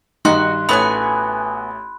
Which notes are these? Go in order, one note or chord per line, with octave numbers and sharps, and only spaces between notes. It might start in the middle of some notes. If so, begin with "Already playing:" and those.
G2 D#3 D#4 F#4 C6 F#6
A1 A3 B3 F#4 C#5 G#5 B5